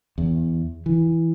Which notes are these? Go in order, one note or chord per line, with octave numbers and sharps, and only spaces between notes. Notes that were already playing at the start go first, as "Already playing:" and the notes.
E2
E3